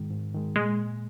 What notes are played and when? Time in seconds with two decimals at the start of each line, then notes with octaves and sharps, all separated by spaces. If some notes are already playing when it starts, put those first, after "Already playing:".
Already playing: G#2 D#3 G#3
0.11 G#2
0.34 D#3 G#3
0.56 A#2 G#3